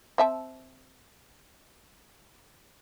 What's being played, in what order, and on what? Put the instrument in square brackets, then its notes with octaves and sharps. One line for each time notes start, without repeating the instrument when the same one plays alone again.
[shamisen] C4 E5 A5